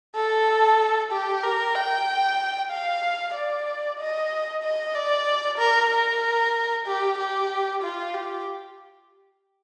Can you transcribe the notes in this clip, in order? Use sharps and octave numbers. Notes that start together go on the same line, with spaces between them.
A4
G4
A#4
G5
F5
D5
D#5
D#5
D5
A#4
A#4
G4
G4
F4
G4